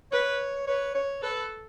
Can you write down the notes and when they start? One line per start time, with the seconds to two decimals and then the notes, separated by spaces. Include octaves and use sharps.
0.12 B4 C#5
0.67 B4 C#5
0.95 C#5
1.22 A4 B4